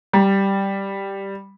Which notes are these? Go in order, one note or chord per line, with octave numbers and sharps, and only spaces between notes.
G3